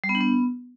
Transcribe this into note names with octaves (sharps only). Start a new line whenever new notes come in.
G3
B3
D4
B3